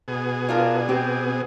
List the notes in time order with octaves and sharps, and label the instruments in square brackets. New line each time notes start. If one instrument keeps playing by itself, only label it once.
[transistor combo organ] B2 G#4
[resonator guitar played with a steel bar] D4 F4 A#4
[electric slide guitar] C4 [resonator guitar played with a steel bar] G4